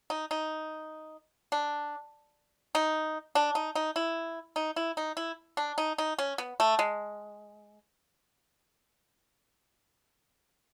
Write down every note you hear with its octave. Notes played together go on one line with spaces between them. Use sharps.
D#4
D#4
D4
D#4
D4
D#4
D#4
E4
D#4
E4
D#4
E4
D4
D#4
D#4
C#4
B3
A3
G#3